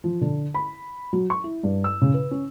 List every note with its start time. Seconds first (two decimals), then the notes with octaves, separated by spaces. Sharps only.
0.04 F3
0.21 D3
0.54 B5
1.13 F#3
1.30 C#6
1.44 E4
1.63 G2
1.84 E6
2.02 C#3
2.14 B4
2.31 C#4